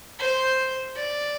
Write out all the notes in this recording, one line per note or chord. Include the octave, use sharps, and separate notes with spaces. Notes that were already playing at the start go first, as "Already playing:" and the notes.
C5
D5